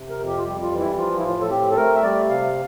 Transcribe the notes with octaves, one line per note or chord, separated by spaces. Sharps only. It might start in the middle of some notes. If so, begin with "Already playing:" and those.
Already playing: C3
A#4
F2
G4
F4
G3 G4
F4
E3
E4
F3 F4
E4
A2 F4
A4
C4 G4
A4
A3 A#4
E5
G3 D5
C3 F5